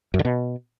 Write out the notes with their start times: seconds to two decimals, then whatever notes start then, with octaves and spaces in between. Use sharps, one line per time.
0.14 F#2
0.19 D3
0.25 B2